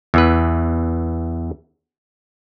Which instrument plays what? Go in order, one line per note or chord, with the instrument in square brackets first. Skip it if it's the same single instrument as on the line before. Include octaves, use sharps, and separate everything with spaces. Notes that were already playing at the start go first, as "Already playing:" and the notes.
[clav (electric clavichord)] E2 E3 B4